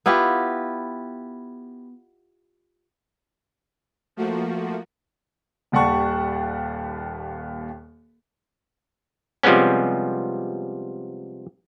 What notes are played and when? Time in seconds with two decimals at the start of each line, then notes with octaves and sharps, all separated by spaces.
0.06 B3 E4 F4 G4
4.16 F3 A3 A#3 F#4
5.72 D#1 D#2 G3 F#5 A5 C#6
9.43 C3 F3 G3 G#3 B3 C#4